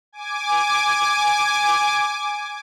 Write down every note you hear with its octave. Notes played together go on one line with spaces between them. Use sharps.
G#5 D6